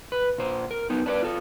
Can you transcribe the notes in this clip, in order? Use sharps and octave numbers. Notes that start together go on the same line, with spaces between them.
B4
A#2 C5
A#4
B3 D#4
D4 B4 C#5 D5
F4 A4